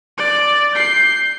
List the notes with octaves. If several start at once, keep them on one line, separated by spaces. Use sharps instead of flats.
D5
G6 C7